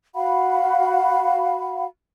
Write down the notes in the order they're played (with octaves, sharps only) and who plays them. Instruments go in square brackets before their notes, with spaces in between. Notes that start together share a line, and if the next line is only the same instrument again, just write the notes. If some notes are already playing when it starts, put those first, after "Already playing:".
[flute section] F#4 F5 F#5 B5